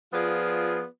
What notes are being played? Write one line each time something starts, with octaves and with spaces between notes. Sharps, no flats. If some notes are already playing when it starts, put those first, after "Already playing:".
F3 B3 F4 G#4 D5